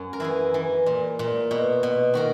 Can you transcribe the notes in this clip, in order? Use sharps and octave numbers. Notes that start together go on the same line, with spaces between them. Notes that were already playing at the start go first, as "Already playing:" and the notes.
Already playing: F#2
A#4
E3 E4 G#4
E3
A#2
A#2
B2
B2
D#3 F#4 A#4